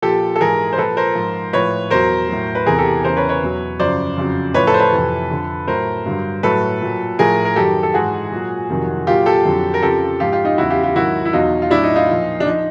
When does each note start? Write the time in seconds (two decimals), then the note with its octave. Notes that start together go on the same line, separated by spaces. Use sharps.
0.02 A#2 F3 G4 A4
0.36 A4
0.40 G#2 E3 G#4 A#4
0.73 C5
0.78 A#2 F3 A4 B4
0.97 A#4 C5
1.15 G#2 F3
1.53 A2 F3 B4 C#5
1.91 E2 B2 F#3 A#4 C5
2.29 A2 F#3
2.55 B4
2.66 E2 C3 E3 G#4 A#4
2.78 G4 A4
3.04 E2 C#3 E3 A#4 C5
3.16 B4 C#5
3.29 B4 C#5
3.42 E2 B2 F#3
3.80 F#2 C#3 F3 C5 D5
4.17 F2 C#3 F#3
4.54 A2 F3 B4 C#5
4.67 A4 B4
4.74 C5
4.80 A4 B4
4.92 F2 C3 E3
5.30 F2 D3 F3
5.68 A2 F#3 A#4 C5
6.06 G2 D3 F#3
6.43 A2 F#3 A4 B4
6.81 A#2 F#3
7.19 A2 F3 G#4 A#4
7.45 A#4
7.56 F#2 D#3 F#3 G4 A4
7.83 A4
7.94 G#2 E3 F#4 G#4
8.31 A#2 F#3
8.70 F2 C3 D#3 F#3
9.07 A#2 F#3 F4 G4
9.26 G4 A4
9.45 F2 D3 F#3
9.74 A#4
9.82 F2 C#3 F3 G4 A4
10.20 G#2 F3 F4 G4
10.32 F4 G4
10.45 D#4 F4
10.58 E2 C#3 F#3 E4 F#4
10.70 F4 G4
10.83 F4 G4
10.96 G#2 D#3 F#3 E4 F#4
11.25 E4
11.33 E2 B2 F#3 D#4 F4
11.62 F4
11.71 A2 F#3 D4 E4
11.84 D#4
11.96 D#4 F4
12.08 A#2 F3
12.40 D4
12.46 F3 D#4